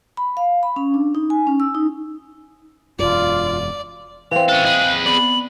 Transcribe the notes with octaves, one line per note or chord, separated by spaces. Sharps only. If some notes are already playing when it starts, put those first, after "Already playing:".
B5
F5
B5
C#4
D4
D#4
G#5
C#4
E6
D#4
E1 F#2 F4 D5
E3 C4 F5 F7
C#4 A4 F#6
G#4 B4 D#5
B3 D5 B5 F#7